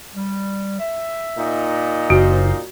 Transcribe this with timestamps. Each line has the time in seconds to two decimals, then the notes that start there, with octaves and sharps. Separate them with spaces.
0.14 G3
0.79 E5
1.38 A#2 D#4
2.10 F#1 F4 F#4 A#4 C5